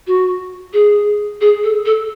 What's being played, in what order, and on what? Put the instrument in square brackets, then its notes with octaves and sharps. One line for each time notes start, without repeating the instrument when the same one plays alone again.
[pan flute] F#4
G#4
G#4
A4
A4